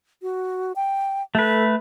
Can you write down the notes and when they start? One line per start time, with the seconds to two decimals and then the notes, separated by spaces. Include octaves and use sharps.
0.22 F#4
0.76 G5
1.35 A3 A4 B4